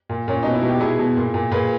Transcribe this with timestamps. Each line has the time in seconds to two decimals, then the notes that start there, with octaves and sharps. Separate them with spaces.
0.09 A#2
0.28 A#2 C#4
0.43 B2 D#4
0.55 E4
0.63 B2
0.68 G4
0.80 B2 E4 G#4
0.99 B2
1.17 A#2
1.34 A#2
1.51 A#2 G#4 B4